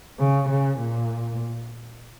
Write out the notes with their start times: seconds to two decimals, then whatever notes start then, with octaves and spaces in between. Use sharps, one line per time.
0.19 C#3
0.49 C#3
0.80 A#2